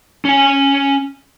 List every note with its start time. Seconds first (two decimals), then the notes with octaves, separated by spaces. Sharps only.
0.25 C#4 G#5